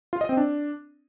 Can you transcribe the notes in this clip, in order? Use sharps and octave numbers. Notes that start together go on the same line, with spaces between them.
F4
D#5
C4
D4